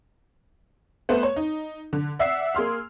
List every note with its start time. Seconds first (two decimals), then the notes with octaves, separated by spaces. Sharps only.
1.09 A3 B3 C5
1.23 C#5
1.36 D#4
1.93 D3
2.19 D5 E5 F#5 E6 C7
2.55 A#3 G#4 C6 F6